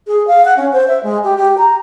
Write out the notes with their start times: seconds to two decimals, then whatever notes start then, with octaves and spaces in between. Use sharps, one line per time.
0.07 G#4
0.27 F5
0.45 F#5
0.57 C#4
0.73 C5
0.88 E5
1.03 G#3
1.24 G4
1.37 G4
1.58 A#5